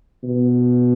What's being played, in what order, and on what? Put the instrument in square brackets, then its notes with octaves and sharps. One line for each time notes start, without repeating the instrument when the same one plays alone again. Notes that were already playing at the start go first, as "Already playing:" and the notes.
[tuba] B2